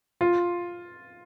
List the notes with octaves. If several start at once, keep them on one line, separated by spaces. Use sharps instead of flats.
F4